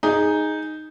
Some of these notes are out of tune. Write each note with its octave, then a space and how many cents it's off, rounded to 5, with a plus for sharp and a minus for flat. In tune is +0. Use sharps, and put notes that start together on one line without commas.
D#4 +0 G#4 +0